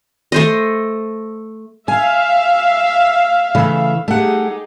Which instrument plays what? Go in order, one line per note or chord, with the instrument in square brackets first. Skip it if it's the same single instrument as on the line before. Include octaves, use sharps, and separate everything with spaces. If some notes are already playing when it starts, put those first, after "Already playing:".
[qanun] A3 C5 D#5
[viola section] E5 F5 [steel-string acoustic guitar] G#5
[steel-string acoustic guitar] C#3 E3 A3
[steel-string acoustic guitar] A3 F#5 [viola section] D#4 G4 G#4